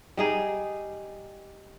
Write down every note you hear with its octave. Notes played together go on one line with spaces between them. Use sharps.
G3 D#4 G#4